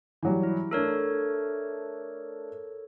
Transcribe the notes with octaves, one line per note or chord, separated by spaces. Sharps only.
E3 F#3 G3
E4
A3 D4 A4 A#4 C#5